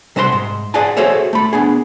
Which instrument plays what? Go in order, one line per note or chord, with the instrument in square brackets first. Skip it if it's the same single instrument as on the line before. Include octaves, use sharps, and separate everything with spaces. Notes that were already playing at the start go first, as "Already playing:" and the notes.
[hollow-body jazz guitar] C3 G3 C5 F#5 A#5 C6
G#2
G#4 D5 F5 F#5 G#5 A5
F#4 G#4 A4 C5 C#5 E5
A3 B5
B3 D4 G#4